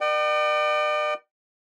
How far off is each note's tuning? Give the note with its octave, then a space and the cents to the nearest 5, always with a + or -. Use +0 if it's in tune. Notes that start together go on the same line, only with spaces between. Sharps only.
A#4 +35 D5 +45 G5 -35